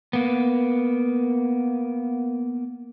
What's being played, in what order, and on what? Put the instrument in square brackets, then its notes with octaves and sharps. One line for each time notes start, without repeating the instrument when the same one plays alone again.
[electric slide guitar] A#3 B3